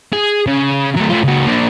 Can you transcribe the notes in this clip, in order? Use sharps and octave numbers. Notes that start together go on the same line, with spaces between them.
G#4
C#3
F#3 A3
A3 F4
C#2 F#4
A#3 D4